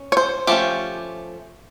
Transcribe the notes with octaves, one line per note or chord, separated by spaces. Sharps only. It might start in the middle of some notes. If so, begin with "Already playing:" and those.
Already playing: C#4
C#5
C5
F3 A3 C#4 G4